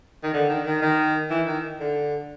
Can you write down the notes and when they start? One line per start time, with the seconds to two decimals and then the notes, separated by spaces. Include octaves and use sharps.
0.23 D#3
0.33 D3
0.49 D#3
0.66 D#3
0.82 D#3
1.31 E3
1.47 D#3
1.80 D3